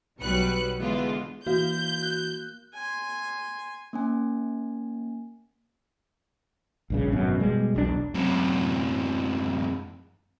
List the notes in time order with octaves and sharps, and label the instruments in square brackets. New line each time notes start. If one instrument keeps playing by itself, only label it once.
[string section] B1 F#3 G3 B4 F#6 C#7
D3 E3 G#3 B3 F4
[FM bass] E3 [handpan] A#3 [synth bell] F#4 F5 [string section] G6
[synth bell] F#6
[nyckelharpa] G#5 C6
[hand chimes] A#3 C#4 G#5
[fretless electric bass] A#1 G2 C#3
G#1 F#2 B2
B2 G3 G#3
E1 B1 B2 D4
[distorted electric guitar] F#2 C3